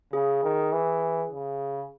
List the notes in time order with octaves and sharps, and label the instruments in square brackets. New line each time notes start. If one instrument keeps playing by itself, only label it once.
[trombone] C#3 [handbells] G#4
[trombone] D#3
E3
C#3